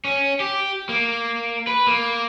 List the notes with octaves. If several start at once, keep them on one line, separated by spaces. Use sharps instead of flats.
C#4
G4
A#3
B4
A#3